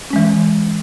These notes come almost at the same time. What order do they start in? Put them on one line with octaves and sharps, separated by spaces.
C#4 G#3 E3